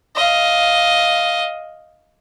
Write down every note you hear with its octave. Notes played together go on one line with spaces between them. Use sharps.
D#5 F5